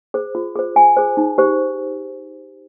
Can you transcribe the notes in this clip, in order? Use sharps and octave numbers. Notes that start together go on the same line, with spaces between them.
G#4 C5
F4
G#4 C5
F4 G#5
G#4 C5
D#4
G4 C5